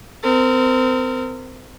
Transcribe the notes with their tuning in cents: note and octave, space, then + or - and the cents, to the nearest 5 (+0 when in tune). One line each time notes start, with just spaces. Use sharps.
C4 -30 A#4 -30